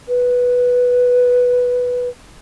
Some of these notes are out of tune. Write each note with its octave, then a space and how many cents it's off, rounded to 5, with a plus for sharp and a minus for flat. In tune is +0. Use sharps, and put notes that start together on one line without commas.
B4 -5